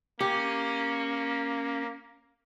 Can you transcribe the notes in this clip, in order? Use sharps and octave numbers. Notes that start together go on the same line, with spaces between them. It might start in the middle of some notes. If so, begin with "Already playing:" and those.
A#3 C#4 G4